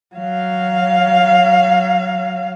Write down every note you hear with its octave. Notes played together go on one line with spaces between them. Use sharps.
F#3 F5